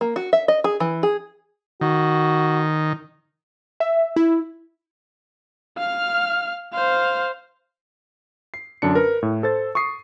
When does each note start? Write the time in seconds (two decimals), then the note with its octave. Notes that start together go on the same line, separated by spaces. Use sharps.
0.01 A#3
0.16 F#4
0.33 E5
0.48 D#5
0.64 G#4
0.80 E3
1.03 G#4
1.81 D#3 F#4
3.80 E5
4.16 E4
5.78 F5 F6
6.74 C5 F5
8.54 C7
8.82 F#2 D3 D4 C#7
8.95 A#4 B4
9.23 A2
9.43 A4 C5 A6
9.75 C#6 D#6 C7